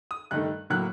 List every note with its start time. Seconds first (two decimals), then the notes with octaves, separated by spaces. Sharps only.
0.11 D#6
0.31 G2 D#3 A3 F#6
0.70 A2 F#3 A#3 F#6